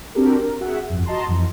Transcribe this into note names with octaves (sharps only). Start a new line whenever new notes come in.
C4 D4 F#4 G4 A4 A#4
A#4
F#4 G#4 E5 F#5
G1 F2
F#4 D#5 A5 A#5 C6
F2 E3